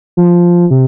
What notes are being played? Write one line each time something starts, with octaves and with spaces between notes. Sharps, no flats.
F3
C3